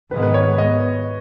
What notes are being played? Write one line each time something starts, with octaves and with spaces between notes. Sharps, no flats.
G#2 D#3 G#3 B3 B4
B4
C#5
D#5